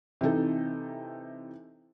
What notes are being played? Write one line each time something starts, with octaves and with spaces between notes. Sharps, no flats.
C3 E3 D#4 A4